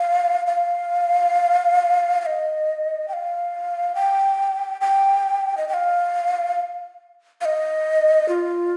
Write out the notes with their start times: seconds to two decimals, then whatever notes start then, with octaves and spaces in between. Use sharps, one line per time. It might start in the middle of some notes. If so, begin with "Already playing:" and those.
Already playing: F5
0.47 F5
2.22 F5
2.26 D#5
3.08 G5
3.13 F5
3.95 G5
4.81 G5
5.57 D#5
5.69 G5
5.74 F5
7.41 F5
7.45 D#5
8.29 F4